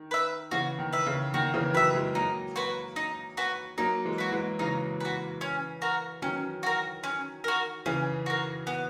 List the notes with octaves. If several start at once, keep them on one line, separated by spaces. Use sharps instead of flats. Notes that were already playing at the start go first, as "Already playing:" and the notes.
Already playing: D#3
B4 E5
C#3 E3 F#4
D#3
B4 E5
C#3
D#3 F#4
C#3 E3
D#3 F#3 B4 E5
E3 G#3
F#3 A#3 D#4
F#4 B4
D#4
F#4 B4
F#3 A#3 D#4
E3 G#3
F#4 B4
E3 G#3
C#3 E3 D#4
F#4 B4
C#4
F#4 A#4
D#3 F#3 C#4
F#4 A#4
C#4
F#4 A#4
C#3 E3 C#4
F#4 A#4
B3